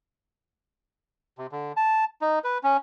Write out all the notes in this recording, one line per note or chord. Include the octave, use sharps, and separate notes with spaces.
C3
D3
A5
D#4
B4
C#4